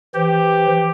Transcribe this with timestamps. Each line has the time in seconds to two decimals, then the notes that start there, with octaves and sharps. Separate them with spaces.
0.15 E3 G4 C5